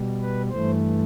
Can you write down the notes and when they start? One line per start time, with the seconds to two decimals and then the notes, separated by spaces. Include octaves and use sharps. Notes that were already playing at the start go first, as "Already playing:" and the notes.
Already playing: B2 G3
0.21 B4
0.50 G2 E3 A3 C5